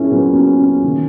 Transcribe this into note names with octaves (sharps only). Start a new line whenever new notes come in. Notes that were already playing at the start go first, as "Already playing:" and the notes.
Already playing: A#2 F#3 A#3 C#4 E4 G#4 A#4
A#2 F#3 A#3 B3
C#4
C#4
D#3 A#3